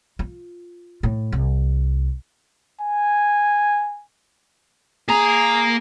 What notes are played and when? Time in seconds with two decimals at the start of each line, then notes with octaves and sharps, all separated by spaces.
0.19 F4
1.03 A2
1.32 C2
2.81 G#5
5.08 A#3 G#4 A#5